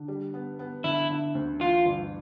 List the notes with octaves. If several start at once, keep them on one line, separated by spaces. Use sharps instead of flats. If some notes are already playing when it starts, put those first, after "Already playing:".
Already playing: D3
G3
B3
B3
D3 E4
D3
D2
E3 F4
G1